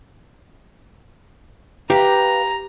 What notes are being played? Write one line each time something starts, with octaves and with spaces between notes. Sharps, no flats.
G4 B4 F5 A#5